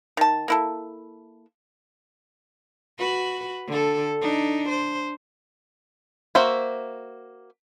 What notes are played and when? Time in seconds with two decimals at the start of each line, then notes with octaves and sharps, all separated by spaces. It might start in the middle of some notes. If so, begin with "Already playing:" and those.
0.17 D#3 A5
0.48 A#3 E4 A4
2.99 F#4 B4
3.67 D3 A4
4.22 D4 D#4
4.69 C5
6.35 A#3 F#4 C5 E5